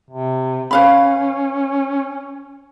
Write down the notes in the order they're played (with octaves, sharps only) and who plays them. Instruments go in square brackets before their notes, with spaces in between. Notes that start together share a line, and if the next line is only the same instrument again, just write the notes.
[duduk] C3
[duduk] C#4 [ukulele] B4 F5 B5